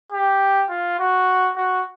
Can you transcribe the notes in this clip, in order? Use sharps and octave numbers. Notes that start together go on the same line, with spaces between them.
G4
F4
F#4
F#4